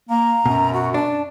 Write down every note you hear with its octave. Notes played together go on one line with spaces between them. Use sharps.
A#3 A#5
F#2 B2
F#4
D4 A5